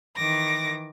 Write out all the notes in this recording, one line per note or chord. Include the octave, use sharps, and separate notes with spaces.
D#3 E3 D6 A#6